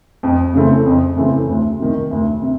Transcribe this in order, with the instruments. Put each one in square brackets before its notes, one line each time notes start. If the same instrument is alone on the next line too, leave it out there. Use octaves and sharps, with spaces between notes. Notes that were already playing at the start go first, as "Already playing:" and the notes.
[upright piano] F2
C#3 E3 A3 C4
F2
C#3 E3 A3 C4
D2
C3 D#3
D2
C3